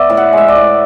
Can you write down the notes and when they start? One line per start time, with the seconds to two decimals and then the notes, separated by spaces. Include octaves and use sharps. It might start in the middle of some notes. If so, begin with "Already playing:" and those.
Already playing: B3 D5 E5
0.10 A2
0.17 F#5
0.33 G#3 E5
0.48 D5
0.56 A2